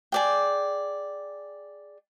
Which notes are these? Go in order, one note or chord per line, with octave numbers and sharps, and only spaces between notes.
G#4 D5 G5